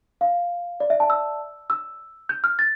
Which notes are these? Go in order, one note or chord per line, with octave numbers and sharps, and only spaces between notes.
F5
D5
E5
A5
E6
E6
G6
F6
A6